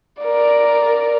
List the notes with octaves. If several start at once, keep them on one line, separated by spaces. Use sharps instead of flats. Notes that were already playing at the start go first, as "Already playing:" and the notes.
A#4 D5